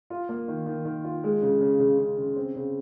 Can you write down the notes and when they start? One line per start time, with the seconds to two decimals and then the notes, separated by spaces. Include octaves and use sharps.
0.10 F4
0.29 A#3
0.48 D#3
0.66 D#3
0.85 D#3
1.04 F4
1.24 G#3
1.42 C#3
1.61 C#3
1.80 C#3
1.98 C#3
2.17 C#3
2.36 C4
2.55 C#3